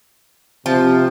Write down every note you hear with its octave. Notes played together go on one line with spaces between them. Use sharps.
C3 F3